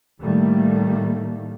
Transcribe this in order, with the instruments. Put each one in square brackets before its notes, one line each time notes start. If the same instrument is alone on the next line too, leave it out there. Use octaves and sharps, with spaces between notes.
[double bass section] A2 D#3 G3 A3 A#3